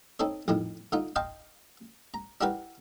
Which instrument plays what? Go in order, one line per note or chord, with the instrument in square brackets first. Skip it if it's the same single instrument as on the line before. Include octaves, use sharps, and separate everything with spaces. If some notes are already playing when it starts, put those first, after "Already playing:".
[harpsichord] C4 D#4 A4 C#5
A#1 F2 A2 D#3
D3 D#4 F4
D#5 F5 G5 A5 C6 C#6
A#5
D4 E4 F#4 G4 A#4 B4